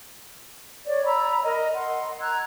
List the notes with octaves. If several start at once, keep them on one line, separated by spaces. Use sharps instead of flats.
C#5 D5
A#5 B5 E6
A#4 D#5
F#5 C6
A#5 E6 F#6 G#6